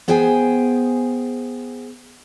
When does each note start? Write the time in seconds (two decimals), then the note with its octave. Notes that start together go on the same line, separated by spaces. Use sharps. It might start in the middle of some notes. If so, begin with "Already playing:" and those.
0.08 B3 G#4 C5 G5 G#5